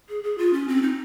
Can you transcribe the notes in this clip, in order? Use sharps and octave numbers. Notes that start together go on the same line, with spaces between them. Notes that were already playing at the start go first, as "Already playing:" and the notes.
G#4
G#4
F4
C#4
C4
D#4